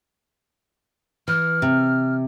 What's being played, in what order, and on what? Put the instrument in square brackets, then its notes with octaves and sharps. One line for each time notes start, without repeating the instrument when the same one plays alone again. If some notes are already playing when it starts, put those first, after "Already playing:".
[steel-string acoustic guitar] E3 [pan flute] F6
[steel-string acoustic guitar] C3